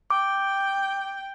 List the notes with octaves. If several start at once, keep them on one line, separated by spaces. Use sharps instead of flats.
G5 D6